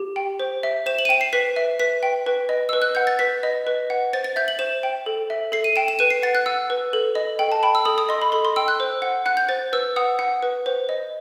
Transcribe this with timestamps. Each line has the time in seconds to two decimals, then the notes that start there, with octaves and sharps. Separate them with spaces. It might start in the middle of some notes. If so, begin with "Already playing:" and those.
Already playing: G4
0.16 G5
0.40 C5
0.63 E5
0.86 C5 E7
0.99 F#7
1.05 D#7
1.09 G5 E7
1.21 C7
1.33 B4 B6
1.56 E5
1.80 B4 B6
2.03 G5
2.26 B4
2.49 D#5
2.69 B4 E6
2.82 F#6
2.95 F#5 G6
3.07 A6
3.19 B4 B6
3.43 D#5
3.67 B4
3.90 F#5
4.13 C5 A6
4.24 A6
4.36 E5 G6
4.48 F#7
4.59 C5 E7
4.83 G5
5.06 A4
5.30 E5
5.52 A4 C7
5.64 D#7
5.76 G5 E7
5.88 E7
5.99 B4 D#7
6.10 C7
6.23 F#5 A6
6.35 F#6
6.46 F#5 E6
6.70 B4
6.93 A4
7.15 D#5
7.39 A4 G5
7.52 A5
7.63 G5 B5
7.75 E6
7.85 A4 D#6
7.98 D#6
8.09 D#5 C6
8.22 B5
8.32 A4 C6
8.45 C6
8.56 G5 E6
8.68 F#6
8.80 C5
9.02 F#5
9.26 F#5 F#6
9.37 G6
9.49 C5 A6
9.73 B4 E6
9.96 F#5 D#6
10.19 F#5
10.43 B4
10.66 C5
10.89 D#5